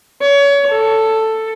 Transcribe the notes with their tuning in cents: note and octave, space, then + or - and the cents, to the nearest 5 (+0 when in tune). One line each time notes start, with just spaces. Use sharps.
C#5 +30
A4 +5